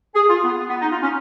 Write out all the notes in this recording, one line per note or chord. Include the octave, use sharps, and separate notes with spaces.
G#4
F4
B3
B3
D#4
F4
C#4